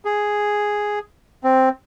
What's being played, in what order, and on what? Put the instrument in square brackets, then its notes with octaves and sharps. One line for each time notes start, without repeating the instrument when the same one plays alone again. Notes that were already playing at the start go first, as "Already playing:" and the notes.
[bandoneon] G#4
C4